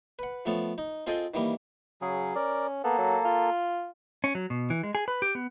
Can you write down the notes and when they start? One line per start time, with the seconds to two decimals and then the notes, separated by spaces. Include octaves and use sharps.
0.19 B4 F#5
0.45 F3 A3 B3 A4 C#5
0.78 D#4
1.07 C4 F4 G#4 A4 D#5 G5
1.34 D#3 E3 G3 A#3
2.01 C#3 F#3 G#4
2.35 C#4 A#4 D5
2.84 A#3 B3 A4
2.98 F#3
3.25 F4
4.24 C#4
4.35 F#3
4.50 B2
4.70 E3
4.83 G#3
4.95 G#4
5.08 B4
5.22 G4
5.35 B3